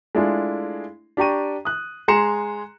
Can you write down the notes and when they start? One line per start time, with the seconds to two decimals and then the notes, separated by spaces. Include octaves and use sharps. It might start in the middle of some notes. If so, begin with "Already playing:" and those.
0.15 G#3 A3 D4 E4 F4 G#4
1.17 D4 G4 G5 A#5 C#6 D#7
1.65 D#6 F#6
2.08 G#3 G#4 A#5 C6 C#7 E7